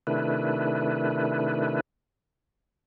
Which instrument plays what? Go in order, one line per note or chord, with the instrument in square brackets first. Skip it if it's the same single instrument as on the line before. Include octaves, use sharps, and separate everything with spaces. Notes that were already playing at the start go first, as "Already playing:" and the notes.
[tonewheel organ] C3 D#3 A3 D4 E4 B4